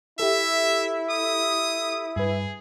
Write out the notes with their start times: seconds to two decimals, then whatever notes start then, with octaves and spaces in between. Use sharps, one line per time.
0.19 E4 G4 A4 E5
1.10 D#6
2.16 G2 G#4 B4